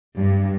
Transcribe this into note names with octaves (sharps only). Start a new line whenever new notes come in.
G2